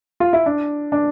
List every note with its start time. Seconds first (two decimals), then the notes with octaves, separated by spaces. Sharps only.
0.20 F4
0.33 E4
0.46 D4
0.92 D4